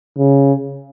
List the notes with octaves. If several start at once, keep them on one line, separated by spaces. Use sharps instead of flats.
C#3